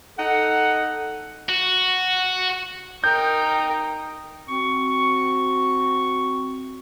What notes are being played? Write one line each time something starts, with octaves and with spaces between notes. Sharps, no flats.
D#4 A4 F#5
F#4
D#4 A#4 G5 G6
C4 F#4 C#6